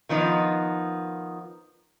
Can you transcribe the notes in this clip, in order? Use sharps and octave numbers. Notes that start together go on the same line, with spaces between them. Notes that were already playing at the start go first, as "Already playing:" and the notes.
D#3 F3 B3 D#4